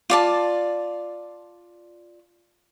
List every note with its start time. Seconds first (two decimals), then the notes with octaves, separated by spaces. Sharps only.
0.10 F4 D5 A5